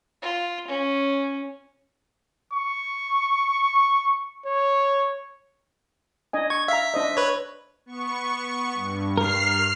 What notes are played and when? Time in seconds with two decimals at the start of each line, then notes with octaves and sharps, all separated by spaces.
0.22 F4
0.67 C#4
2.53 C#6
4.46 C#5
6.33 D4 D#5 G#5
6.50 C#6 G#6
6.68 E5 F5 A#5 B6
6.94 D4 C5 D#5
7.17 B4 C#5
7.86 B3 C#6
8.74 G2
9.18 A#4 F6 C7